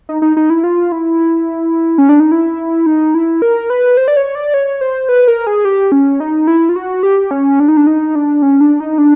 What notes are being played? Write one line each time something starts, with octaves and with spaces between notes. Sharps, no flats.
D#4
D#4
D#4
E4
F4
E4
C#4
D4
D#4
E4
D#4
E4
A#4
B4
C5
D5
C#5
D5
C#5
C5
B4
A#4
G#4
G4
C#4
D#4
E4
F4
F#4
G4
C#4
D4
D#4
D4
D#4
D4
C#4
D4
D#4
D4